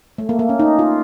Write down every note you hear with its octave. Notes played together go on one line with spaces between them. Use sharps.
A3
A#3
A#3
C#4
D#4
F4